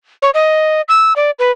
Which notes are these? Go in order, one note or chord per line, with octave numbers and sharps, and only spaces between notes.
C#5
D#5
E6
D5
B4